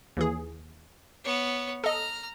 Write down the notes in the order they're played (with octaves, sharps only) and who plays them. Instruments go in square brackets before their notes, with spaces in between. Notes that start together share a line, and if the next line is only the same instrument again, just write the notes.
[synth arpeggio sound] D#2 E3 G#4
[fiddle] B3 C#5
[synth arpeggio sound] A4 D#5 [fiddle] A#5 F6